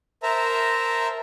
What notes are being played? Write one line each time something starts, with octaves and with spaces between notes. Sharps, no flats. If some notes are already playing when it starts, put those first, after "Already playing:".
A#4 C5 E5 A5 A#5